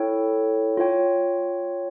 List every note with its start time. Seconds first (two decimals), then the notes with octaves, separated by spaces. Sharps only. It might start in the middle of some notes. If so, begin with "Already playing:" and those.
Already playing: E4 A4 C#5 G5
0.77 F4 C#5 G5